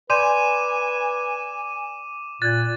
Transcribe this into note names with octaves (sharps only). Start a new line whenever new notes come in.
B4 D5 G#5 C6 D6 G6 D#7 E7
A#2 F#6 G#6 A6